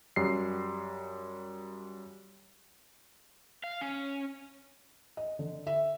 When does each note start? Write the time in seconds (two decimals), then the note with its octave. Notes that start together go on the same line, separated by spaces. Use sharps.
0.16 F#2 G3 C7
3.64 F5
3.81 C#4
5.17 D#5
5.39 D3
5.67 E5